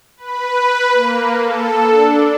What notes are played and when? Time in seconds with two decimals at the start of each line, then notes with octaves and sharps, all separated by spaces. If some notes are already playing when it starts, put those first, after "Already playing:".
0.17 B4
0.94 A#3
1.41 A4
1.90 D4